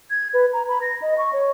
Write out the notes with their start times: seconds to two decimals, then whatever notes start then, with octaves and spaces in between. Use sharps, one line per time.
0.10 G#6
0.34 B4
0.53 A#5
0.68 B5
0.82 A#6
1.02 D#5
1.18 C#6
1.33 C#5